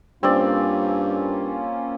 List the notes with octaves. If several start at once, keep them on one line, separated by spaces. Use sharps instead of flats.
G2 A#3 C4 C#4 F4 D5